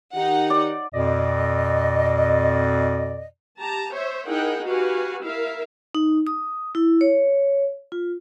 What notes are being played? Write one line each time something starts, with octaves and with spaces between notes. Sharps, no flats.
D#3 D#4 G4 F#5
D5
F2 B2 D5 D#5
G4 A5 A#5
C5 C#5 E5
D#4 E4 G#4 A#4 F#5 G5
F#4 G4 B4 F5 G#5
E4 A#4 E5 F5
D#4
D#6
E4
C#5
F4